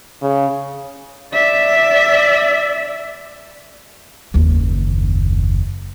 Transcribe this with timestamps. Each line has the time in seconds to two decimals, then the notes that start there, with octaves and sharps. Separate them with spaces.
0.22 C#3
1.33 D5 E5
4.34 F#1 D#2